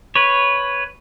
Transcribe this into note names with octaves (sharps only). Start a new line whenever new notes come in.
B4 C#5